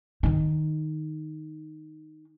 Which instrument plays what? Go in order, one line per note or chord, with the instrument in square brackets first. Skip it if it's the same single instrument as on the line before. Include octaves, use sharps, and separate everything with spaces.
[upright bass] D#3 D#4